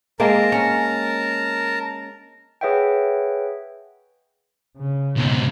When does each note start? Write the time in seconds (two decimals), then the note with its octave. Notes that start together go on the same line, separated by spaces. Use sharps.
0.20 G#3 A#3 C4 A#4 A5 A#5
0.52 C#4
2.61 G#4 B4 C#5 E5 F#5 G5
4.77 C#3
5.16 B1 G#2